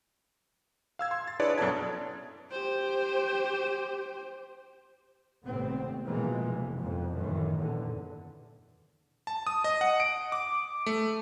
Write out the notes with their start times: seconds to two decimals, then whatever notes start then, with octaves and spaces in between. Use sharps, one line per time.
0.99 F5 E6 G#6
1.11 C6
1.28 A6
1.39 D4 E4 G#4 B4 C#5 D5
1.58 F#2 B2 A4 A5 G#6
2.51 G4 C5
5.45 G#1 A2 C3 B3 C4
6.06 B2 E3 F3 G#3 A#3
6.46 F1
6.80 F2 G#2 B2 F3
7.15 F#2 A2 D#3 E3
7.57 E2 A#2 D3
9.27 A5
9.47 D#6
9.64 D#5
9.81 F#5
10.00 D7
10.32 D6
10.86 A3